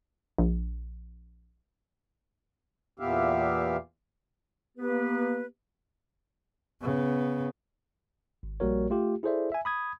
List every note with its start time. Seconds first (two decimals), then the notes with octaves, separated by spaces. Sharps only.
0.38 A#1
3.00 E2 A#2 B3 G4 E5 F5
4.77 A#3 B3 G4 B4
6.82 C#3 B3
8.43 G#1
8.60 A#1 G3 A#3 F#4 A#4 C#5
8.90 A3 F4 G4
9.23 E4 G#4 A4 C5 D5 E5
9.52 E5 G#5
9.65 B5 D#6 G#6